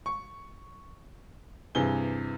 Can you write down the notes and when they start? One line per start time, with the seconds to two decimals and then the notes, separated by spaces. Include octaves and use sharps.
0.06 C#6
1.75 G2 C3 E3 G#4 G7